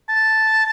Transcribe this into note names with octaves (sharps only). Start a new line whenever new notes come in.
A5